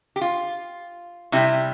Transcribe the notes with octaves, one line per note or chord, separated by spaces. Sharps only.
G4
F4
C3 G3 E4